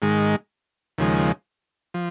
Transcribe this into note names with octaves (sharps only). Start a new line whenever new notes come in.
G#2 D#3 G#3
D#2 C#3 F3 G#3
F3